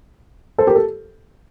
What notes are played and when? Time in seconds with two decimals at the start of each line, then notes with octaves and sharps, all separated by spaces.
0.58 A4 C5
0.67 G4 A#4
0.76 A4